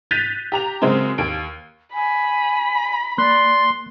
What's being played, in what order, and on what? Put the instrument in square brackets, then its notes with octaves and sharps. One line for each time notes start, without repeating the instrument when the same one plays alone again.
[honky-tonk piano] F#6 G6 A6 B6 D#7 F7
G4 A#5 F7
C#3 F#3 G#3 A#3 C4
D#2 D7
[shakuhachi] G#5 [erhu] B5
[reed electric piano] A#3 F#6 [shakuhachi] D5 [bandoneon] C6